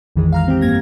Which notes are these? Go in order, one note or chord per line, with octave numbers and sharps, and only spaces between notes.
A#1 F2 D#3 E3 G#3
F5 A#5 F6
C4 G4
G2 A#3 G#6 A#6